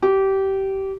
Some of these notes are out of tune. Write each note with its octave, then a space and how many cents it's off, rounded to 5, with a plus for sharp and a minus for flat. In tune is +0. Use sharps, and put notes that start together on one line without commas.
G4 -20